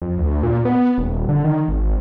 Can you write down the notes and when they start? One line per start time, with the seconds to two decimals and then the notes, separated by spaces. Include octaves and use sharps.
0.02 F2
0.18 D2
0.43 A#2
0.65 B3
0.98 D#1
1.29 D3
1.44 D#3
1.68 G#1